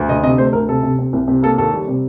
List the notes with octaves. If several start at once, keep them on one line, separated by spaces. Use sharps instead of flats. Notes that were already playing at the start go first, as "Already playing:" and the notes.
Already playing: D2
D3 D#5
C3 D#5
A3 C5
D2 A#4
C3 A4
C3
C3
C2
C3
A#3 A4
D#2 A4
G3
C3